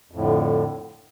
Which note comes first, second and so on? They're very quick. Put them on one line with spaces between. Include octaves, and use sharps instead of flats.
F2 A2 D3